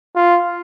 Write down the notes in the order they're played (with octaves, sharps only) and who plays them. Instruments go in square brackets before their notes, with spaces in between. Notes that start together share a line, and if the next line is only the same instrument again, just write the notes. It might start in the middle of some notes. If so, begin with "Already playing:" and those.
[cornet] F4